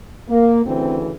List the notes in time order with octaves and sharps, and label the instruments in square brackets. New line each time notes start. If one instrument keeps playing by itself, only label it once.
[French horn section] A#3
D2 C#3 E3 C4